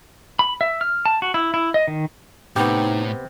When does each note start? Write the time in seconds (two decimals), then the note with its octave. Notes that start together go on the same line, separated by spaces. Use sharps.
0.39 B5
0.61 E5
0.81 F6
1.06 A5
1.22 F#4
1.34 E4
1.54 E4
1.74 D#5
1.88 D#3
2.56 A2 C3 B3 D#4 G4